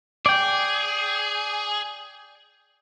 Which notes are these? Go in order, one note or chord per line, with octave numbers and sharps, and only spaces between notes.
G#4 D5 G5